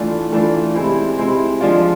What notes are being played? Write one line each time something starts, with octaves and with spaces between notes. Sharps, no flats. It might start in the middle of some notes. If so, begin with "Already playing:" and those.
Already playing: E3 A3 D4 F4
E3 A3 D4 F4
C3 G#3 C4 E4
C3 G#3 C4 E4
F3 G#3 D4 F4